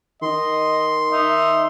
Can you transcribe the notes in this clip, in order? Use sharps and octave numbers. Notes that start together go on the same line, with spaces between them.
D#3 D#5 C6
D#4 E5